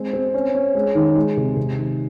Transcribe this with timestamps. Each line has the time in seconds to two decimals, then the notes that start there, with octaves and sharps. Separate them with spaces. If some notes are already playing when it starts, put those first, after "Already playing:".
Already playing: G#3 C4
0.13 C4
0.34 C#4
0.55 C#4
0.75 G#3
0.95 D#3
1.15 G#3
1.37 C3
1.57 C3
1.77 D#3